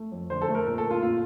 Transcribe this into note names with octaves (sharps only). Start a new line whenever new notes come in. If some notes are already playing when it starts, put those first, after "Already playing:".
Already playing: A3
F2
D3 C5
A4
A3
A#4
A#2 A#4
A4
A#2
F4
A#2 F4